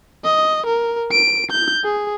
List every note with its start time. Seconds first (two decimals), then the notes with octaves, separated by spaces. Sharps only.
0.24 D#5
0.67 A#4
1.11 D7
1.51 G6
1.84 G#4